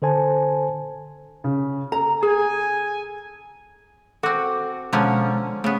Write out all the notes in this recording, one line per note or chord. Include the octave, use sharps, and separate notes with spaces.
D3 A4 C5 G#5 A5
C#3
A4 A#5
G#4 G#5
C4 F#4 A4 F#5 D6
B2 D3 F3 G#3 C#4 A#5
C#3 A3 B3